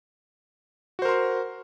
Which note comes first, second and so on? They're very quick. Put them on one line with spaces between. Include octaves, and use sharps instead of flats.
F#4 C5 A#4 C6